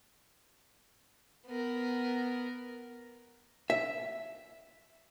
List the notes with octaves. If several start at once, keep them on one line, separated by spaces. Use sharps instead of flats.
B3 A#4
E5